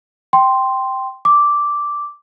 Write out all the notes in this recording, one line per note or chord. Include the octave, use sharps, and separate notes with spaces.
G5 C6
D6